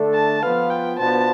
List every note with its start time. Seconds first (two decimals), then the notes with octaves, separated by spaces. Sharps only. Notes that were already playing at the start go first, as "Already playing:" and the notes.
Already playing: D3 A3 D4 A4
0.14 A5
0.43 F3 B3 F4 B4 F5
0.70 G5
0.98 B2 B3 D4 F4 C5 A5